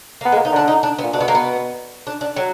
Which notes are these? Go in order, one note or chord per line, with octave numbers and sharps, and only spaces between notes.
A#3
B3
G#3
A#3
D#4
D3 D4
D#4
D4
B3
A#2
B2 D4
B3
A#3
B3
D4
D4
F#3